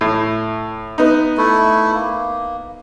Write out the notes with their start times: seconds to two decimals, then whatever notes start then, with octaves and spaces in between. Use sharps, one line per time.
0.01 A2
0.98 B3 D#4
1.37 A3 E4
1.94 A#3